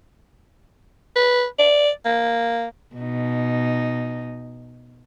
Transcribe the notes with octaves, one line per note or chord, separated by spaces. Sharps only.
B4
D5
A#3
B2 D#4